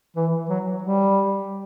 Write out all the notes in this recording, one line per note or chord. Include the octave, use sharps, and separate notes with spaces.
E3
F#3
G3